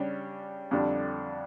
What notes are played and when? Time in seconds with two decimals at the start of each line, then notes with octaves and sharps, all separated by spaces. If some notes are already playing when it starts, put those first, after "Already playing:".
Already playing: C#3 G3 D4 G4 C#5
0.71 F2 D3 G3 D4